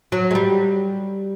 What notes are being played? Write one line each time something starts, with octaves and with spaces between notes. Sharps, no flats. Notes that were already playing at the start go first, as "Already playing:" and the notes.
F#3
G#3
G3